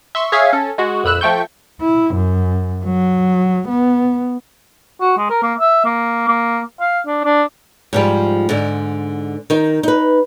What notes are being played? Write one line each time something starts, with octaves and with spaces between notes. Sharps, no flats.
E5 C6 C#6
G#4 C#5 E5 F5 G#5
C#4 A4
G#3 F#4
A#1 F2 B5 E6 F#6 E7
F3 A3 G5 C#6 G6
E4
F#2
F#3
B3
F#4
G#3
A#4
A#3
E5
A#3
A#3
F5
D4
D4
G#2 F3 G3
G#2 D3
D#3 D#4
D#4 B4